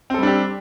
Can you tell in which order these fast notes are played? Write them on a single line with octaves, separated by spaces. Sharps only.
C4 A4 G3 D4 G4